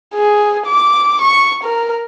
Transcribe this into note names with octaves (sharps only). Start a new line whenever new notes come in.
G#4
D6
C#6
A#4